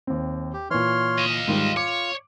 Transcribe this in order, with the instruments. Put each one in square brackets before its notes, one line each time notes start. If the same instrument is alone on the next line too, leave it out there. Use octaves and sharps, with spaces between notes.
[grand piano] D#2 C4
[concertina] G4
[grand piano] A#2 E3 [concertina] C#5 C6 F6
[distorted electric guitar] D#5 F5
[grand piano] G#2 D#3 G3 [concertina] F4
[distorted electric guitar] C#5 [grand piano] D6